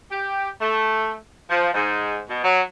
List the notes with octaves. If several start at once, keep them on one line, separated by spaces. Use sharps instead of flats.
G4
A3
F3
G#2
B2
F#3